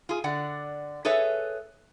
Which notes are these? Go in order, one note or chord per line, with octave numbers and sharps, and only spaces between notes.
F4 G#4
D3 D5 F#5
G#4 A4 B4 C#5 E5